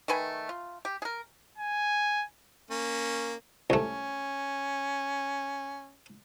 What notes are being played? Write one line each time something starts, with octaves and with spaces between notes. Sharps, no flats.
D#3 A3 B4 G#5
F4
G4
G#4 A#4
G#5
A#3 C#4
C2 A3 C#4